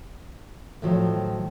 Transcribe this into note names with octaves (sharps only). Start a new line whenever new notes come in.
A2 D#3 F3 F#3